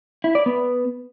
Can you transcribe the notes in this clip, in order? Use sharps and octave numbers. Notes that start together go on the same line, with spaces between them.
E4
D5
B3